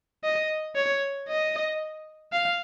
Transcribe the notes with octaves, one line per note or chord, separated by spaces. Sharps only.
D#5
C#5
D#5
F5